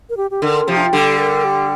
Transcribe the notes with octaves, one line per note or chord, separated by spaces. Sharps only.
A#4
G4
G4
D3 A#4
C3 F3 G4
D4
F4
D3 G3 G4
A#4
G4